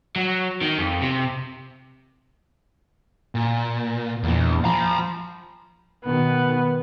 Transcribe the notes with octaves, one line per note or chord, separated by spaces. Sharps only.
F#3
D#3
F2
C3
A#2
E2 A#2 F3
F3 A#5 B5
B2 D#3 B3